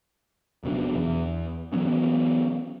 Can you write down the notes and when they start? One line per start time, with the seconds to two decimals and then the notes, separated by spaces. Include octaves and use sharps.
0.64 F1 B2 F#3 D4
0.96 E2
1.73 E3 F#3 B3 C#4